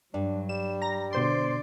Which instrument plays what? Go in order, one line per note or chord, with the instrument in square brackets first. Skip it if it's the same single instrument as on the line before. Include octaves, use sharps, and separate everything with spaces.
[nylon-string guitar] G2 [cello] F#3 [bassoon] D4
[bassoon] G3 [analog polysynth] E7
[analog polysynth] A#5 A#6
[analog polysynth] B2 C5 C6 [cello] D3 D5